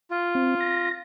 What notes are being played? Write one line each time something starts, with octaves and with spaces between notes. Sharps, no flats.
F4
C4
A#6